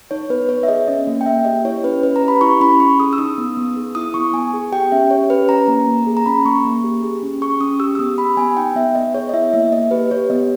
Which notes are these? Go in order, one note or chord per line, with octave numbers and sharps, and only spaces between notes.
D#4 C#5
B3 B4
B3 C#5
E5
G#4 D#5
C#4 D#5
A#3
G5
A#3 E5
G4 D#5
E4 C#5
C#4 B4
C#4 B4
A#5
G4
B5
E4 C#6
C#4 B5
C#4 C#6
G#4 D#6
E6
D#4 D#6
B3
B3
G#4
E4 D#6
B3 C#6
B3 G#5
G#4
G4 G5
C#4 E5
G4 C#5
C#4 B4
C#4 A#5
A#3
A#3
G#4
A#5
C#4 B5
A#3 C#6
A#3
G4
G#4
C#4
G#4 C#6
C#4 D#6
G4 E6
E6
B3 D#6
G4 B5
B3 G#5
D#4 G5
B3 E5
B3 D#5
G#4 C#5
D#5
E4 E5
A#3 E5
A#3 D#5
G4 B4
G4 C#5
B3 D#5